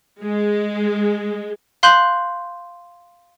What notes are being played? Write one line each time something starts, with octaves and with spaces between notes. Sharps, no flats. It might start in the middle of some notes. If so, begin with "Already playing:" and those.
G#3
F5 C6 F#6 G6 F#7